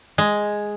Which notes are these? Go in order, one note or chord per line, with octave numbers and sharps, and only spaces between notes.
G#3